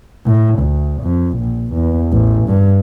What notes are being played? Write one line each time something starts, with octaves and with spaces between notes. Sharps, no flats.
A2
D2
F2
A#1
E2
A1
G2